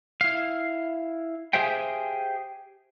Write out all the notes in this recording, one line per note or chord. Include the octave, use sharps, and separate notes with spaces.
E4 F5
G4 G#4 C5 E5 F5 G5